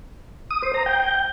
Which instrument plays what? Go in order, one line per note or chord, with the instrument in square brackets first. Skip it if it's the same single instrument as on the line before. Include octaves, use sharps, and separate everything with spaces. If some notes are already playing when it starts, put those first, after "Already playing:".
[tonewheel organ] D#6
C5
A#5
G5